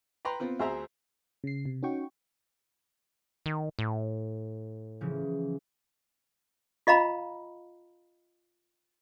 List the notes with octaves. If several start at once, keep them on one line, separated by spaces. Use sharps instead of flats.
B4 G5 A#5 C6
B3 C4 F4
D2 G#4 C5 E5 A#5
C#3 C7
C3
C#4 D#4 F#4 G5 C#6
D#3
A2
C#3 E3 F3
F4 D#5 F5 A#5 B5